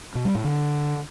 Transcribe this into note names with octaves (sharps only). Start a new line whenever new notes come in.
B2
G3
A2
D3